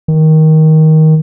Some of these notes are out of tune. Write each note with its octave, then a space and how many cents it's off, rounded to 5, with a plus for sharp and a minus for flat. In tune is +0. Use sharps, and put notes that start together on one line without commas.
D#3 +15